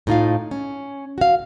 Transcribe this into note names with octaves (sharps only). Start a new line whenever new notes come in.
A2 D#4 F4 F5
C#4
F#4 F5